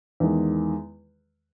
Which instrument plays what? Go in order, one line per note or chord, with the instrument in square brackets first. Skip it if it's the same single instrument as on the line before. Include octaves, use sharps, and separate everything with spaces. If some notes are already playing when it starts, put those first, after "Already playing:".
[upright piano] E2 D#3 G#3